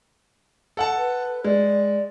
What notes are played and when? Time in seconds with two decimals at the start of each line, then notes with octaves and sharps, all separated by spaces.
0.77 A4 F#5 A5
0.97 B4
1.44 G#3 D5